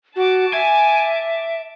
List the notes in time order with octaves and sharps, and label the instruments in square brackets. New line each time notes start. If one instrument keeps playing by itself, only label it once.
[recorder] F#4 [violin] A5 D6
[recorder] E5 [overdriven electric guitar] G#5